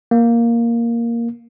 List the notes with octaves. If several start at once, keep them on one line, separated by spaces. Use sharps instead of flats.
A#3